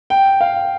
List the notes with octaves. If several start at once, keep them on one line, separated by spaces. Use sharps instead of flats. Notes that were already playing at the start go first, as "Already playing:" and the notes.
G5
F5